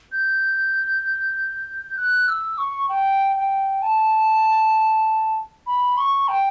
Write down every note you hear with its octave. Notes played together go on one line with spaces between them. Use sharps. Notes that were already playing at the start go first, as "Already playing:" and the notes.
G6
F#6
E6
C#6
G5
G5
A5
B5
C#6
G5